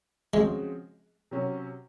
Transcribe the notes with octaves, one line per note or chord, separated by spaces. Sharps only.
C#3 F3 G#3 C4 F#4
C3 F#3 C#4 F#4